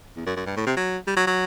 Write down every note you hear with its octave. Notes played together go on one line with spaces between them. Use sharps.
E2
F#2
F#2
G2
A2
C3
F#3
G3
F#3
F#3